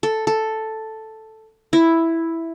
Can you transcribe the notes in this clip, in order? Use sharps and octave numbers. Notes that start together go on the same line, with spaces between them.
A4
A4
E4